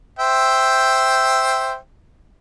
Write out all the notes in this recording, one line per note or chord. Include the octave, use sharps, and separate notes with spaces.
C5 E5 G5